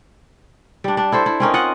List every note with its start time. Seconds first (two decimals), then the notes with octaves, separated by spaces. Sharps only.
0.84 G3 D4
0.97 D4
1.12 E4 A4 C5
1.26 E4
1.40 C4 C#4 D#4 A#4
1.54 F4 D#5 F#5